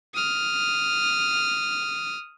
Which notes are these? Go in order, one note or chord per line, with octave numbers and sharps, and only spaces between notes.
D#6 F6